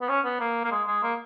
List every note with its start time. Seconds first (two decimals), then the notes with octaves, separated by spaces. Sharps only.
0.01 B3
0.09 C#4
0.25 B3
0.40 A#3
0.64 A#3
0.72 G#3
0.87 G#3
1.03 A#3